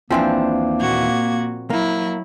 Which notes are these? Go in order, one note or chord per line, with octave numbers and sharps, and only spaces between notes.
D#2 E3 F3 A#3 C4 D4
A#2 F#4 G#6
F#3 A#3 E4